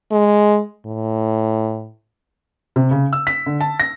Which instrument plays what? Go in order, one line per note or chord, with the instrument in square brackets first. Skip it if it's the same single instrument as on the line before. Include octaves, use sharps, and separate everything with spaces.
[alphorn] G#3
A2
[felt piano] C3
C#3
E6
B6
D3
A5
A#6